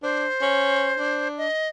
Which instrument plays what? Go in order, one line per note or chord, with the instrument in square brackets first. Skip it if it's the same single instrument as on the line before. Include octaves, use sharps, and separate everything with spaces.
[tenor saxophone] D4 [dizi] C5
[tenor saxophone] C#4
D4
[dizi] D#5